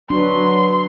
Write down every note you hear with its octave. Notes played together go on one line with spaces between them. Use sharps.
F#3 D4 B4 C6